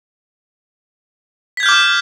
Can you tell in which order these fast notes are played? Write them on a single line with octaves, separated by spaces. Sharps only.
B6 G#6 G6 F6 D6